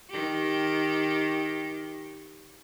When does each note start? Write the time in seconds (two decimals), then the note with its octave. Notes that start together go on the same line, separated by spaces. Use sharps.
0.11 D#3 G4